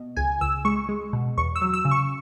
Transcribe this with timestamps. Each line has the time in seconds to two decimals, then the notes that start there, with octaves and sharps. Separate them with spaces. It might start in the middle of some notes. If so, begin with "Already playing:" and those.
Already playing: B2
0.17 C#2 G#5
0.41 C#2 E6
0.65 G#3 C#6
0.89 G#3
1.13 B2
1.38 E2 C#6
1.56 E6
1.62 F#3
1.74 E6
1.85 C#3
1.91 C#6